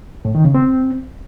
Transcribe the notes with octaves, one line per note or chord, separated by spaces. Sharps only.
A2
D#3
C#3
C4